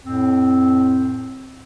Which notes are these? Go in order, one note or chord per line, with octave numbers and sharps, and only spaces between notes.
F2 A2 C4